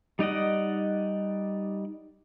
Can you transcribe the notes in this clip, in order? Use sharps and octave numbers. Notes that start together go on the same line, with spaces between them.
G3 D#4 D5 D#5 F#5